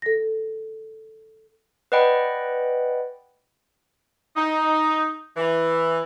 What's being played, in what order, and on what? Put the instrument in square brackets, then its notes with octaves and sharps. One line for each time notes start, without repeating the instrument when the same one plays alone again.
[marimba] A4 A#6
[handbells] B4 D5 D#5 F#5 G5 B5
[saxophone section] D#4
E3